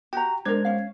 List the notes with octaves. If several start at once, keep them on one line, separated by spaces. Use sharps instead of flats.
F#4 G4 G5 A#5
G#3 D4 A#4 C5 G#6
C#4 F5